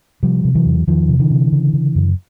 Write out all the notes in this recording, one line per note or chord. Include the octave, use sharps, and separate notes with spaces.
C3 F3 G3
C3
E3 F#3
E2
E2 D#3 F3
C3
D3 E3
C3
C#3
C#3
F#2